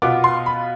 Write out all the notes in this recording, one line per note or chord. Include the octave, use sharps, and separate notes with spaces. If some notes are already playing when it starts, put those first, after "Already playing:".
B2 B3 F4 D6
C6
B5